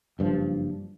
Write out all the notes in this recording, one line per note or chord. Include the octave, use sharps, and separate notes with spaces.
F#1 G2 C#3 F3